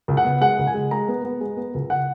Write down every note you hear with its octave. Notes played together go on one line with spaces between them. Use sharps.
C#2
F#5
B3
G#3 F#5
C#2
G#5
G#3
G#3 A#5
B3
B3
G#3
B3
C#2
F#5